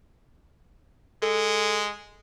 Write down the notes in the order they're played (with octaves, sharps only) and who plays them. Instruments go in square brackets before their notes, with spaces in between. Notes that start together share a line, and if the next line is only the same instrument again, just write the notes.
[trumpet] G#3 [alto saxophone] A4